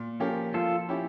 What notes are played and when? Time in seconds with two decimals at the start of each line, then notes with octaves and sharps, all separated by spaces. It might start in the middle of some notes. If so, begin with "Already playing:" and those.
Already playing: A#2
0.20 F3 C#4 G4 A#4
0.54 F3 F4 A4
0.89 C#4 E4 G4